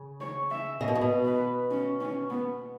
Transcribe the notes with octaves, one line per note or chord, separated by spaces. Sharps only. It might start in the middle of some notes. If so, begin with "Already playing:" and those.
Already playing: C#3
C#5
E5
C#3 D#5
B2
A2
B2
B4
C#4
C#4
B3